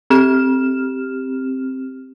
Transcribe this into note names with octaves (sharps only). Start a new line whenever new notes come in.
C4 G4 F6 E7